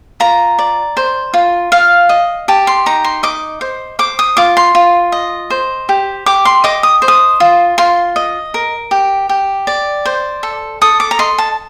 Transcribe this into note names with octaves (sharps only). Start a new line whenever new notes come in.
F4 A#5
D5
C5
F4
F4 F5
D#5
G4 A5
C6
D#4 A#5
C6
D#5 D6
C5
C5 D6
D#6
F4 D6
C6
F4
D#5
C5
G4
G4 D6
C6
D#5 D6
D#6
C5
D#6
F4
F4 C6
D#5
A#4
G4
G4
D5
C5
A4
A4 D#6
D6
A#5
D#5 C6
A5